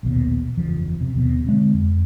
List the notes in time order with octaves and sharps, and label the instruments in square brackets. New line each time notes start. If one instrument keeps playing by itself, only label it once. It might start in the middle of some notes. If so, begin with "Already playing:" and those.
[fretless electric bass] A#1 D#2 B2
F#1 E2 C#3 F3
C3
D#2 B2
D3 G#3 C4
F2